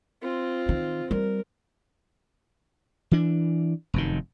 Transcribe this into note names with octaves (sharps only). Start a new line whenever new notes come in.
C4 F4
D#3
G3 A#4
E3 D4
F1 F#2 D#3